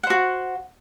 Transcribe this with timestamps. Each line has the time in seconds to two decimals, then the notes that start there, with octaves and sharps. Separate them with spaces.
0.03 F#5
0.07 C5
0.10 F#4